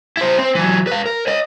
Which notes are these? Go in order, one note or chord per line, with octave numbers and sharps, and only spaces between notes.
E4 C5
C4
E3 F#3
B4 F5
A#4
C#5 D#5